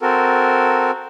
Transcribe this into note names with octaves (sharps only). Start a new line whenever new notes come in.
C4 F#4 A4 A#4